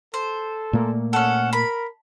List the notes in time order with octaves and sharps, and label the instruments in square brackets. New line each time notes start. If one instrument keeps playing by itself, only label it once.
[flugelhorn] A4 [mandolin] C5
[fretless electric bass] A#2 A3 A#3
[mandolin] C#4 A4 [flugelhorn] F#5
[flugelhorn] A#4 [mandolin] B5